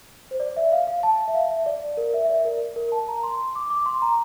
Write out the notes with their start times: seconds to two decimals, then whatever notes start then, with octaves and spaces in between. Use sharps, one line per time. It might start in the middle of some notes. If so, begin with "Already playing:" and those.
0.31 C5
0.40 D5
0.57 E5
0.72 F5
0.87 F5
1.03 A5
1.28 E5
1.35 F5
1.50 E5
1.66 D5
1.97 A#4
2.14 E5
2.25 E5
2.29 D5
2.45 A#4
2.76 A#4
2.92 A5
3.08 A#5
3.23 C6
3.55 D6
3.70 D6
3.86 C6
4.02 A#5